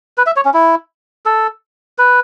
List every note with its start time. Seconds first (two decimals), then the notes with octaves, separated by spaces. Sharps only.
0.18 B4
0.26 E5
0.36 C#5
0.45 C#4
0.54 E4
1.26 A4
1.98 B4